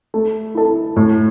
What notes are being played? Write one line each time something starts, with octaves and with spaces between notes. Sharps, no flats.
A3
E4 A4
A2